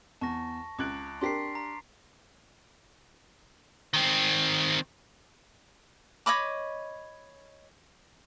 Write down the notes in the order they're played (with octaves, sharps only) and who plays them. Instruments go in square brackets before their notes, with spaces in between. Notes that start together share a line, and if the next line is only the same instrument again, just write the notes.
[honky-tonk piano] E2 [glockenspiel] A5 C#6 A#6
[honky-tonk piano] C#2 F#6 [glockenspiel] D6 A6 D7
[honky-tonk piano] D4 G4 A#4 [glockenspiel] C6 B6 C7
[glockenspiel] A#5
[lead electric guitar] D#3 C4
[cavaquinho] C#5 D#5 B5 D6